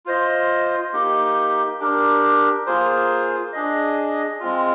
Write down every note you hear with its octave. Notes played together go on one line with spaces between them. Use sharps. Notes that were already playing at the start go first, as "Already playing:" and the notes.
F4 C5 D#5
A#3 D#4 G4
D4 G4 A#4
A#3 F4 G#4 C5
D4 G#4 D#5
G#3 C4 F4